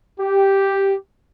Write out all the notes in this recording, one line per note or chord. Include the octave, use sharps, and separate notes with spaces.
G4